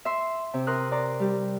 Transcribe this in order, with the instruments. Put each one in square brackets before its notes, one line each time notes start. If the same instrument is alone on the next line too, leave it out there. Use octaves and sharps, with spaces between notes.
[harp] E5 C6
C3
A#4 C6 D#6 F#6
D5 A#5 C6
G3 G4